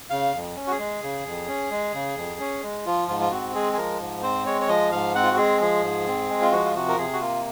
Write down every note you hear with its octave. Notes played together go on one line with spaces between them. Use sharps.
C#3 F5
F2
C#4
F#4
G#4
G#3
C#3
F2
C#4
G#3
C#3
F2
C#4
G#3
F3 F4
G#2 F4
F4
C4 F#4
G#3 G#4
G#4
F3 A#4
G#2
C4 C5
G#3 C#5
C#5
F3 D#5
G#2 F5
C4 F#5
F4
F#4
G#3 G#4
F3 G#4
G#2
C4
G#3
F4
F3 F#4
F4
C3 F#4
A#4
C3 G#4
F#4
A#3 F4